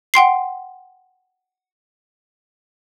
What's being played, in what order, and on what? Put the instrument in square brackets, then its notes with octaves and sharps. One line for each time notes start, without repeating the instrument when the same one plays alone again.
[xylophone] F#5 G5 C6 C7